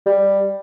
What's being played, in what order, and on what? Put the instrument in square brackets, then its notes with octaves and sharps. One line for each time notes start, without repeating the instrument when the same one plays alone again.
[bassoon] G3